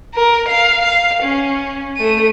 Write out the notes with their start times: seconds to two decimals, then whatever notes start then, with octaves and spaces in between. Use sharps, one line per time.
0.15 A#4
0.49 F5
0.81 F5
1.23 C#4
1.97 A3 D#7